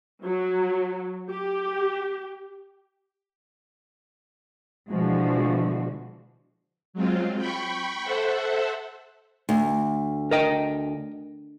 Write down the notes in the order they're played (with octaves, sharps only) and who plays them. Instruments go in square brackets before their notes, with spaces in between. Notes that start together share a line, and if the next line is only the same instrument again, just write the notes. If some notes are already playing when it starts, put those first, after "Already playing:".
[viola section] F#3
G4
[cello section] B2 D3 E3 F3 G#3 F#4
[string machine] F#3 G#3 C4 F4
G5 B5 C#6
A4 C5 E5 F#5
[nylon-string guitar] D2
[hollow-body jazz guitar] A#4 D#5 G5